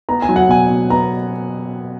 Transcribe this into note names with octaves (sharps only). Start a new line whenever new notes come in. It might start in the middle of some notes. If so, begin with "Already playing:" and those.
B3 A#5
G#5
F#3
F#5
B2 G#5
B2
B3 A#5